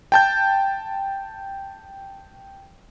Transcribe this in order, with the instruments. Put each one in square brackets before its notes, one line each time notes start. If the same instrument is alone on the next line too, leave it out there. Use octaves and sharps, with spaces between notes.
[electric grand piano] G5 A5 G6